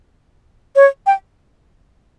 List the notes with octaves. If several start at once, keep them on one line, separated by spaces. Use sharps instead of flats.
C#5
G5